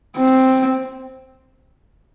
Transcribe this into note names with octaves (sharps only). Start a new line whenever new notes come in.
C4